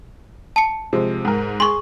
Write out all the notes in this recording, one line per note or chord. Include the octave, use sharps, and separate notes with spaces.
A5 C#7
C3 F3 G#3
G#2 A#4
G#4 C6 C#6